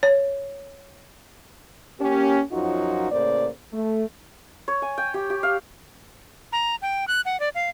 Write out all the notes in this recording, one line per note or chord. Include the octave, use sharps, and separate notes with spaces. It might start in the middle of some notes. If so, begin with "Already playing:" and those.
C#5
A#3 C#4 G4
F#2 F3 F#3 D#4 F4 F#4
A2 C#3 A#3 C5 D5
A3
C#5
G#5
G5
G4
G4
F5
A#5
G5
F#6
F#5
D5
F5